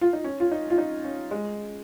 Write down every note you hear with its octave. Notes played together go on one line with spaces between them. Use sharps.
F4
D#4
C#4
F4
D#4
F4
D#4
C#4
G#3